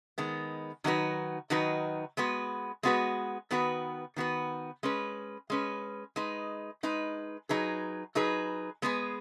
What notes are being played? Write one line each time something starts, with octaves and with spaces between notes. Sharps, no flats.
D#3 G#3 B3
D#3 F#3 D#4 F#4 B4
D#3 F#3 D#4 F#4 B4
G#3 B3 F#4 B4
G#3 B3 F#4 B4
D#3 B3 F#4 B4
D#3 B3 F#4 B4
G#3 C#4 B4
G#3 C#4 B4
G#3 D#4 B4
G#3 D#4 B4
F#3 D#4 G#4 B4
F#3 D#4 G#4 B4
G#3 B3 G#4 B4